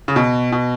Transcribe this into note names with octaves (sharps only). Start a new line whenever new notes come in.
C#3
B2
B2